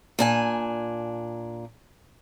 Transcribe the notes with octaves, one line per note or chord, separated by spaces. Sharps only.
A#2 D4 G#5